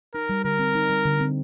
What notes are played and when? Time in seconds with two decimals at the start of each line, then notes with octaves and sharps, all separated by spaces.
0.14 D#4 A#4
0.29 G3
0.44 D3 A#4
0.59 C4
0.75 D#4
0.90 G3
1.05 D3
1.21 C4